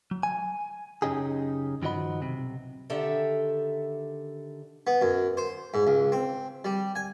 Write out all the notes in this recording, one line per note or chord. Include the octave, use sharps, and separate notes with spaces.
F#3
G#5
F#2 C#3 C#4 D#4 G4 G#4
G2 D#3 F3 F#4 D#5 B5
B1 C3
D3 D#3 G4 A4 E5
B3
F#2
C5
G#2
C#2
C4
G3
G#5